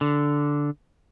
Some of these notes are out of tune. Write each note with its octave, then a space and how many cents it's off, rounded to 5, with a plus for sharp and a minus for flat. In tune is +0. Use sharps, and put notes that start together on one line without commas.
D3 -5